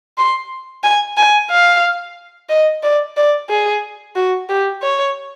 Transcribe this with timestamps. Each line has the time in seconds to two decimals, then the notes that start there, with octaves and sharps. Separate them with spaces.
0.18 C6
0.84 G#5
1.17 G#5
1.50 F5
2.50 D#5
2.83 D5
3.17 D5
3.50 G#4
4.16 F#4
4.49 G4
4.82 C#5